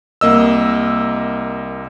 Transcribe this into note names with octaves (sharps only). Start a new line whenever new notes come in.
C2 A#3 D#5 E6